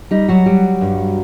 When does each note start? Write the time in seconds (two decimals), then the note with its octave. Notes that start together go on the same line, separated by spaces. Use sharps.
0.11 G3 D#4
0.28 F#3 F#4
0.46 G3
0.81 G2